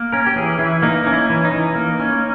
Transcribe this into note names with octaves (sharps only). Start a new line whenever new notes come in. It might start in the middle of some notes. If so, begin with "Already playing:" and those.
Already playing: A#3
C#4 A#4
G4
E3 G#4
E3 E4
A#3 D#4
C#4 D#4
E4
E3
D#4
E3
A#3
C#4